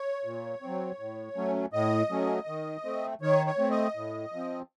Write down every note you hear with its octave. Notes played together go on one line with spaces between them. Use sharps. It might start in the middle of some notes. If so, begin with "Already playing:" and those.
Already playing: C#5
A#2
F#3 C4
A2
F#3 A3 C#4
A2 D#5
F#3 A3 C#4
D#3
A3 C4
D#3 C#5
C#5
A3 C4
D#5
A2
F3 C4